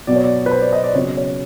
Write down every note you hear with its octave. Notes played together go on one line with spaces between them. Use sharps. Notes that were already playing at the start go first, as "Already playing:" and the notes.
B2 F#3 B3 D5
C#5
D5
B4
C5
D5
D#5
D5
C#3 F#3 B3 C#5
C#5